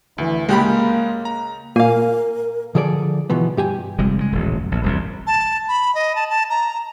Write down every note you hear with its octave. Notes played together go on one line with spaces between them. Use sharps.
D2 E3
C#2 G#3 A#3 G4 B5
A#5
A#2 A#4 F5 G#5
D3 F3 G#4 A4 D5
B2 E3 F3 B3
G2 G4 G#5
F1 C3 G3 G#3
C#3 F#3 G#3
D#1 A1
F#2
A#1
E1 C2 C3
A5
B5
D#5
A5
A5
A#5